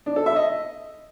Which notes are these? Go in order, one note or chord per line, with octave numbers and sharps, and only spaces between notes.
D4
A4
E5
D#5